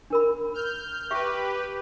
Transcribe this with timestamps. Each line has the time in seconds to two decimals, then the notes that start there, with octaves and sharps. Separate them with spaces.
0.10 D4 A#4 B5
0.54 F6 G6
1.11 G4 B4 E5 C#6